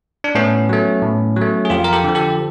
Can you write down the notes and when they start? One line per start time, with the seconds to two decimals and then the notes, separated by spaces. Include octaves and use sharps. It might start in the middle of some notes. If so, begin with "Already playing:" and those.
0.24 D4
0.35 A2 B3 C#4
0.69 F#3 A3
1.02 A2
1.36 F#3
1.41 A3
1.65 G#4
1.70 F2 F4 G4
1.84 A#4
1.93 G4 A4
2.04 D3 F3
2.15 G4 A4